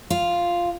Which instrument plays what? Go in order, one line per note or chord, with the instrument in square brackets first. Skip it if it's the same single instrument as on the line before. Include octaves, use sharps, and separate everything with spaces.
[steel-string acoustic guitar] F4